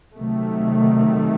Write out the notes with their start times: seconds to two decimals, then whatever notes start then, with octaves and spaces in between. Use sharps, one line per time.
0.18 C3 D#3 F#3 A3